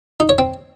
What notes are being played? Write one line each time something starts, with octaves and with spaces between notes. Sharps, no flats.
D#4
C#5
C4